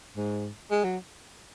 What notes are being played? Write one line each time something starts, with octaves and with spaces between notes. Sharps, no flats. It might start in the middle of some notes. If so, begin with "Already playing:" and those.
G#2
G#3
F#3